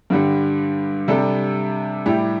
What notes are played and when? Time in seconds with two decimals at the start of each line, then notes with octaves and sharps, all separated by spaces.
0.10 G2 D3 G3
1.08 C3 G3 D4 A4
2.06 A2 G3 E4 G4